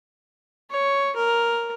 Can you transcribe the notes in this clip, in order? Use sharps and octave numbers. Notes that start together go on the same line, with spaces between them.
C#5
A#4